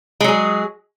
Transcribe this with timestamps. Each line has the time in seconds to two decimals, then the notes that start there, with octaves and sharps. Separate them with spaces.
0.21 G#3
0.24 F#3
0.28 G#4